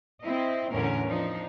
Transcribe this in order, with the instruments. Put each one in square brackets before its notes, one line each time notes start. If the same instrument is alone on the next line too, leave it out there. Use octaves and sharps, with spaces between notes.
[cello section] C4 E4 D#5
E2 A2 D3 C#4 A#4
F3 D4 D#4